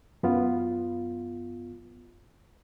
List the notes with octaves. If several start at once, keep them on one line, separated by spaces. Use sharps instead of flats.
F#2 B3 F4